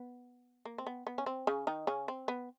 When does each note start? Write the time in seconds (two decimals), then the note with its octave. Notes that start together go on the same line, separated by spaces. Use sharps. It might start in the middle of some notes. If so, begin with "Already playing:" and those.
Already playing: B3
0.65 A#3
0.78 C4
0.87 B3
1.07 B3
1.18 C#4
1.26 C4
1.47 C#3 C#4
1.67 D#3 D#4
1.87 C#3 C#4
2.08 C4
2.28 B3